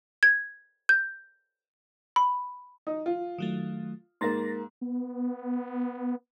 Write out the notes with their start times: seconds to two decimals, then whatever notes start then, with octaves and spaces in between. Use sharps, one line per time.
0.23 G#6
0.89 G6
2.16 B5
2.87 D#4
3.06 F4
3.38 D#3 F#3 A3
4.21 G#2 A#3 C6 A6 A#6
4.81 B3